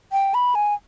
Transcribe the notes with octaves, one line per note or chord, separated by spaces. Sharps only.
G5
B5
G#5